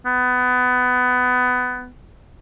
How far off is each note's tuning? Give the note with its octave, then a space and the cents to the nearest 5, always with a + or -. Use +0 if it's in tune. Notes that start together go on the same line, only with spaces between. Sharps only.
B3 +20